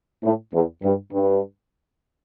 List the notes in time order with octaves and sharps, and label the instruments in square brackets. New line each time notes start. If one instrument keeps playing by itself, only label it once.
[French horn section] A2
E2
G2
G2